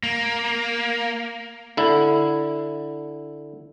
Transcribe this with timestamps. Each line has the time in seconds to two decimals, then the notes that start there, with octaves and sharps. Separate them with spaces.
0.03 A#3
1.77 D3 E4